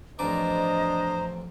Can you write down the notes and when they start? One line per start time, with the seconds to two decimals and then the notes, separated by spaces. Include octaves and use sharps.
0.19 A1 F2 D4 C5 D5 D#5 A#5